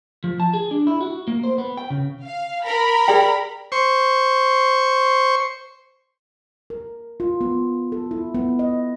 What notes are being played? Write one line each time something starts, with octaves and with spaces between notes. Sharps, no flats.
F3
A5
G#4
D4
E4
F#4
A#3
C5
B3
G5
C#3
F5
A#4 B5
G#4 D5 G5
C5 C#6
A#4
F4
B3
A4
E4
B3
D#5